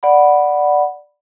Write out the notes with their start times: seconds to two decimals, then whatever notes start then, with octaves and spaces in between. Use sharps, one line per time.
0.03 D5 F#5 B5